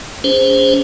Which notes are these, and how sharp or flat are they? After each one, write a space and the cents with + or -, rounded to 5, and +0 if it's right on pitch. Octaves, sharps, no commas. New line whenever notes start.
C#4 +25 G#4 -25 C5 +0